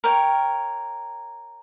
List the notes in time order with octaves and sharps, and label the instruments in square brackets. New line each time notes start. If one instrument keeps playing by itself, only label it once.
[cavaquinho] A#4 C#5 G5